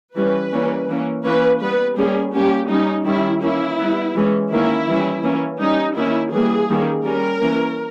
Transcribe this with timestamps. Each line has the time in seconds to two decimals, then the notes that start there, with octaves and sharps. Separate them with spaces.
0.15 E3 G3 C#4 B4
0.52 E3 G3 A#3 C#4
0.88 E3 A#3 C#4
1.25 E3 A#3 C#4 B4
1.61 G3 B3 B4
1.97 G3 A#3 C#4 G#4
2.33 G3 A#3 C#4 G4
2.69 G3 C#4 D#4
3.06 D#3 G3 C#4 E4
3.42 E3 A#3 C#4 E4
3.78 G3 B3
4.14 E3 G#3 C#4
4.51 D#3 A#3 C#4 E4
4.87 E3 G3 C#4
5.24 E3 A#3 C#4
5.59 G3 C#4 D#4
5.96 D#3 A#3 C#4 E4
6.32 E3 G3 A#3 G#4
6.69 D#3 G3 A#3 C#4
7.05 G3 C#4 A#4
7.41 E3 A#3 C#4